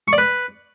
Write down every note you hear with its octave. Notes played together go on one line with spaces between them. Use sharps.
C#6
D5
B4